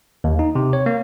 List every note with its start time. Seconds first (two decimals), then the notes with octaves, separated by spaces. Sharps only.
0.24 D#2
0.39 D#4
0.55 C3
0.73 C#5
0.86 A#3